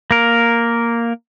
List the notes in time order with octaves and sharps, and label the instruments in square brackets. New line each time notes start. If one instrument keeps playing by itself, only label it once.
[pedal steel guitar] A#3 A#4